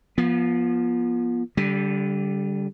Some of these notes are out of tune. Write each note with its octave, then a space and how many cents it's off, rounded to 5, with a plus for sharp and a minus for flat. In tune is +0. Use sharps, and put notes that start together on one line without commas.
F3 +0 B3 -35
D3 -30 G3 +0